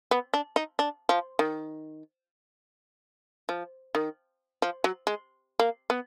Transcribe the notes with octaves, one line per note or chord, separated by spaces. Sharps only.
B3
D4
D#4
D4
F3
D#3
F3
D#3
F3
F#3
G#3
A#3
B3